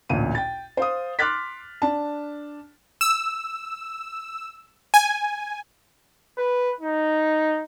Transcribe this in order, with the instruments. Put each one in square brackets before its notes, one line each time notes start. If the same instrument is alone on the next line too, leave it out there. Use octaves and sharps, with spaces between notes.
[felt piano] A1 D2 A#2 D#7
G5 A6
C5 F5 D#6
C6 D6 F6 F#6 A6 B6
D4 A5
[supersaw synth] E6
G#5
[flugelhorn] B4
D#4